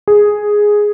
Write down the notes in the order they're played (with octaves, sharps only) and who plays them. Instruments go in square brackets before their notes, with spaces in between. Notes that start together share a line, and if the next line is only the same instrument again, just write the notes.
[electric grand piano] G#4